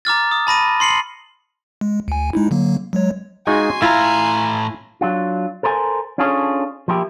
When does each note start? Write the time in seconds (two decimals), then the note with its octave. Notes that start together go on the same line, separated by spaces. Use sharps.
0.05 A#5 D6 F6 A6
0.31 D#6
0.47 A5 B5 A#6 D#7
0.80 C6 C7 C#7 F#7
1.81 G#3
2.08 D2 G#5
2.33 G#3 D#4 E4
2.51 D3 F#3 A#3
2.93 F#3 G#3 C#5
3.47 G#3 D#4 F4 F#4 G#5 C6
3.82 A2 E4 F4 F5 A#5
5.01 F#3 D4 F4
5.63 A4 A#4 C5 D#5 G#5
6.18 C#4 D4 F4 G#4 A4 C#5
6.88 F3 A#3 E4 G4